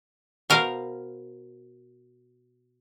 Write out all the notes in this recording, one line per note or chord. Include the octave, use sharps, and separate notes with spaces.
B2 A#4 C5 F5